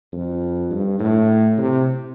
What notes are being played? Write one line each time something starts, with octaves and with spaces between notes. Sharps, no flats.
F2
G2
A2
C3